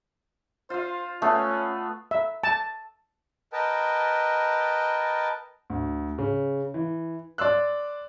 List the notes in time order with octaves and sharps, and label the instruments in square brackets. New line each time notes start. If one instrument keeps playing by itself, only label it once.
[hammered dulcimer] F4 F5 [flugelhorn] C5
[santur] A3 [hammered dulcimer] B3 [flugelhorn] C#4
[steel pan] E5
A5
[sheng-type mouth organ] A#4 B4 D#5 G5 A5
[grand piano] D2
C#3
E3
D5 C6 E6 F#6